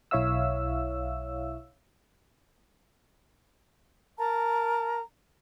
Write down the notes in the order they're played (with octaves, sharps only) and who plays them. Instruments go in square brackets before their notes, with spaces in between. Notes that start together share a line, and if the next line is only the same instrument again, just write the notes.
[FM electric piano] B1 E4 C#5 E5 F5 E6
[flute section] A#4 A5 A#5